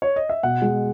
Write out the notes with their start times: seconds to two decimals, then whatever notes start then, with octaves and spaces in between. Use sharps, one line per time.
0.02 C#5
0.16 D#5
0.29 E5
0.43 B2 F#5
0.62 G#3